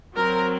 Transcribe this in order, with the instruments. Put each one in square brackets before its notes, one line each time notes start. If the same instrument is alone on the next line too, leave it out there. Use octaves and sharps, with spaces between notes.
[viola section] F#3 C4 A#4